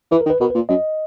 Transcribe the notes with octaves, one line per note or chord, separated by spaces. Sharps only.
E3 B4
A#4
D#3
B4
B2 A#4
B4
A#2
F#2 D#5